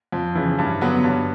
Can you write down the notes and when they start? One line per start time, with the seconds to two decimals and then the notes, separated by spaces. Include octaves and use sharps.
0.12 F2
0.35 C#3 E3
0.58 G2
0.81 D3 F#3 B3
1.04 G2